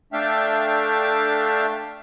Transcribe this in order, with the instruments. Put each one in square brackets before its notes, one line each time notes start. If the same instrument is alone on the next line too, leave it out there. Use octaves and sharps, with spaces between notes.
[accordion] A3 D4 E5 F5 G5